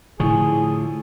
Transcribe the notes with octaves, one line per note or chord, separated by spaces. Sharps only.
A2 D3 F3 E4 G#4 C#6